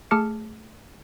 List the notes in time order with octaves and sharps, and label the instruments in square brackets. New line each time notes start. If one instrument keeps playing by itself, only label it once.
[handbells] A3 G#4 A5 D6 F6 C#7